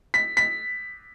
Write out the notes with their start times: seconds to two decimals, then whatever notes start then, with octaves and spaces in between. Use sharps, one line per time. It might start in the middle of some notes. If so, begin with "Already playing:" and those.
0.14 B6
0.37 B6